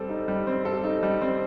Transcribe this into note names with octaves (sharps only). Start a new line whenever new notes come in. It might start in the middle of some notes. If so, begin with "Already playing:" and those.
Already playing: G3 C4 A4
D#4
G3
C4
A4
D#4
G3
C4